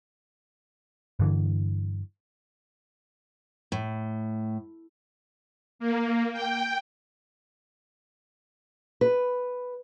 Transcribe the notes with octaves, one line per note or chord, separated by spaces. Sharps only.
G2 D3 E3
A2
A#3
G5
B4